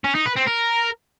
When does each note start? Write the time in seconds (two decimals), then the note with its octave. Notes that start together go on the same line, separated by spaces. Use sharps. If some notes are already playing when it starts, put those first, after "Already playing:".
0.04 C#4
0.15 D#4
0.26 B4
0.36 C4
0.47 A#4